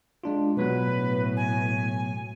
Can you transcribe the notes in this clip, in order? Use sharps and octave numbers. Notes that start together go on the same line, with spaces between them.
G#3 D4 F4
B2 F#3 B3 B4
A2
G#5